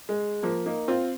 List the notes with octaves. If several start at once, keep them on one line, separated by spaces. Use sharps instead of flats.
G#3
F3 A#3
A#3 D#4
C4 F4